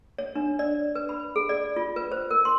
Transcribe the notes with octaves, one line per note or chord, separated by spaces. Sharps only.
C#5
D4
D5
B4
B5
G#4
D5
F4
B4
C5
A#4
C6